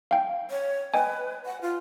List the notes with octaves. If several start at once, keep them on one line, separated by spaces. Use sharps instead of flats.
F5 G5
C#5
B4 D#5 G5 G#5
F#5
F4